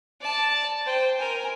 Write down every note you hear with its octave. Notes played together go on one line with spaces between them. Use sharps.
D5 A5
C5 G5
A#4 G#5